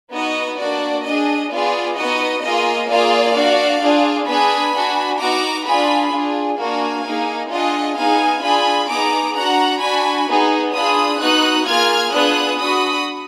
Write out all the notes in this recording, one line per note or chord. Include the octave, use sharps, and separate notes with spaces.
B3 D#4 F#4 D#5
A#3 D4 F#4 D5
D4 G#4 D#5
B3 F4 G#4 D5
B3 D#4 F#4 D#5
A#3 F4 G#4 D#5
A#3 F4 G#4 D5 F5
D4 F#4
D4 F4 G#4
B3 D4 G#4 G#5 B5
D4 F#4
B3 D#4 F#4 A#5 D6
D4 F4 G#4 G#5 B5
D4 F4 G#4
A#3 D4 F#4 F5 G#5
A#3 D#4 G#4
D4 F4 G#4 D#5 F#5
B3 D#4 G#4 F5 G#5
D4 F4 G#4 G#5 B5
B3 D#4 G#4 A#5 D6
D4 F#4 F#5 A#5
D4 F#4 G#5 B5
B3 D#4 G#4
D4 F4 G#4 B5 D#6
B3 D#4 F#4 D#6 F#6
A#3 F4 G#4 F6 G#6
B3 D4 F4 G#4 D#6 F#6
D4 F#4 B5 D#6